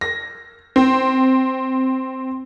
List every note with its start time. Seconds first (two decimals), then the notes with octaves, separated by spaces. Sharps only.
0.01 A#6
0.76 C4